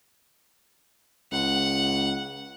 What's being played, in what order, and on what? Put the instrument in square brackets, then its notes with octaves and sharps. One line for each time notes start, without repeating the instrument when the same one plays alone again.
[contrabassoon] C#2 [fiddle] F#5